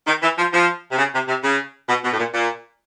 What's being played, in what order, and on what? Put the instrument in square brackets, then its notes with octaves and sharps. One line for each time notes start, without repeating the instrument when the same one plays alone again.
[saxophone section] D#3
E3
F3
F3
C3
C#3
C3
C3
C#3
B2
B2
A2
A#2
A#2